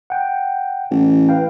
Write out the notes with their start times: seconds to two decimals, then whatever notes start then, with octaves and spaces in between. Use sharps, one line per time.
0.10 F#5 G5
0.91 A1
1.29 B4 F5 G5